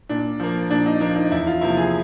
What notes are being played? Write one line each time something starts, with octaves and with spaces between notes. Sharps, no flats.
A#2 D4
F3 A#3
A#2 D4
D#4
F3 A#3 D4
D#4
E2 E4
F4
C3 F3 A#3 E4
G#4